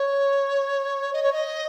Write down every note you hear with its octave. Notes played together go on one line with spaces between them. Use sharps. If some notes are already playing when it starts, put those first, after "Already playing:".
Already playing: C#5
D#5
C#5
D#5